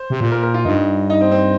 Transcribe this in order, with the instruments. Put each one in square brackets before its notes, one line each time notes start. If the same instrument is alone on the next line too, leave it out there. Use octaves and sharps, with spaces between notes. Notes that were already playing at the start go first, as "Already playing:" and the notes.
Already playing: [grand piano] C5
[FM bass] C3
A#2
[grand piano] A#4
A#4
F4
[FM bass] G2 [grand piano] D#4
[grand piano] D#4
C4
C4